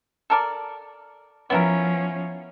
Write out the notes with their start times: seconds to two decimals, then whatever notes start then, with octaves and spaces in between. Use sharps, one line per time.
0.30 A4 A#4 D5
1.50 F3 B3 C#4 E4 A#4